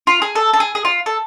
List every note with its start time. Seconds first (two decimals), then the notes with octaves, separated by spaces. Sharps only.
0.07 F4
0.22 G#4
0.35 A4
0.53 A4
0.60 G#4
0.75 G#4
0.85 F4
1.06 A4